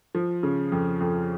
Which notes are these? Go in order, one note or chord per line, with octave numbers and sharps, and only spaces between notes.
F3
C#3
F2
F2